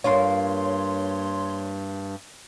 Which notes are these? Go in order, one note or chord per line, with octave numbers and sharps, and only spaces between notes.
G2 A#3 D4 F4 C#5 C6